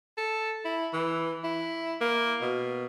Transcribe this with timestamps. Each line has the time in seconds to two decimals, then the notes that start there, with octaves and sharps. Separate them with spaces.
0.18 A4
0.65 E4
0.93 E3
1.44 E4
2.01 A#3
2.41 B2